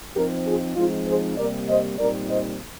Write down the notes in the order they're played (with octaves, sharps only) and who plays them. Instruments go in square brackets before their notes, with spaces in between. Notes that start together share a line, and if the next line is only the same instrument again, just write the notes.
[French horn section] F3 C4 D#4 G4 A#4
F4 G#4
F3 G#3 C4 D#4 F4
G#4 C5
C3 G3 A#3 A#4 D5
C5 D#5
A#2 G3 C4 D#4 A#4 D5
C5 D#5